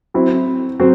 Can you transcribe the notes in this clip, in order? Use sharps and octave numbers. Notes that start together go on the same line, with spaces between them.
F#3 C4 E4
F#3 C4